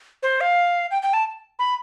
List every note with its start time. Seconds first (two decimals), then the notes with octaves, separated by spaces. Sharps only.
0.23 C5
0.41 F5
0.91 G5
1.02 G5
1.14 A5
1.59 B5